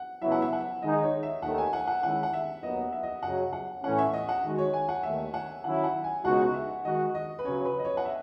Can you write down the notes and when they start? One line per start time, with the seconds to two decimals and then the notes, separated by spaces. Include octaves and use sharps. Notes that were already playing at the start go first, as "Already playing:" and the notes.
Already playing: F#5
0.22 C#2 C#3 F#3 B3 E4 E5
0.32 F#5
0.42 E5
0.53 F#5
0.82 D#3 G#3 D#4 D#5
1.03 C#5
1.23 E5
1.42 D#2 D#3 A3 F#5
1.58 G#5
1.73 F#5
1.88 F#5
2.03 D#3 G#3 C#4 E4 F#5
2.23 F#5
2.33 E5
2.63 D#2 D#3 F#3 B3 D#4 D#5
2.92 E5
3.03 D#5
3.23 F#2 C#3 F#3 F#5
3.53 F#5
3.83 A2 E3 A3 C#4 F#5
3.98 E5
4.13 D#5
4.29 F#5
4.43 D#3 G#3 D#4 F#4
4.58 C#5
4.73 G#5
4.89 F#5
5.03 D#2 D#3 A3 E5
5.34 F#5
5.64 D#3 F#3 C#4 E4 F#5
5.84 F#5
6.04 G#5
6.24 C#2 B2 G#3 D#4 F#4 F#5
6.54 E5
6.84 D#3 G#3 D#4 F#4 D#5
7.15 D#5
7.39 B4
7.45 C#3 F#3 C#4 C#5
7.65 B4
7.79 D#5
7.85 C#5
7.97 F#5
8.05 E5